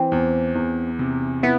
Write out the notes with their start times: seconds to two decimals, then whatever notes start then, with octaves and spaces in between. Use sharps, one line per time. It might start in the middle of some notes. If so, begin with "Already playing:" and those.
Already playing: E3 C4
0.12 E2
0.55 E2
0.99 C3
1.43 B3 E4